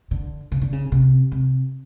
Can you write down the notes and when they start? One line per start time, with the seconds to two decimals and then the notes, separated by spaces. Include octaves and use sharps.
0.11 D3
0.52 C#3
0.61 D3
0.73 C#3
0.92 C3
1.32 C3